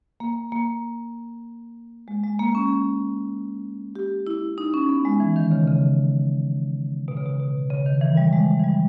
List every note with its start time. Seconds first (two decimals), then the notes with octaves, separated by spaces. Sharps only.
0.20 A#3
0.52 A#3
2.08 G#3
2.24 G#3
2.39 A#3
2.55 C#4
3.96 G4
4.27 E4
4.58 D#4
4.74 C#4
4.89 B3
5.05 G#3
5.20 E3
5.36 D#3
5.52 C#3
5.67 C#3
7.08 B2
7.17 C#3
7.26 B2
7.39 B2
7.71 C#3
7.86 D#3
8.01 E3
8.17 G3
8.33 G#3
8.60 E3
8.64 G3